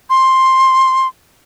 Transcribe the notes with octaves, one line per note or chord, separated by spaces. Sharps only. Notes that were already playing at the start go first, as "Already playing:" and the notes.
C6